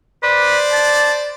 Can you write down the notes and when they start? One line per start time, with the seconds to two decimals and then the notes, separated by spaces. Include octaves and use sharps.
0.23 B4 C5 D5
0.72 A5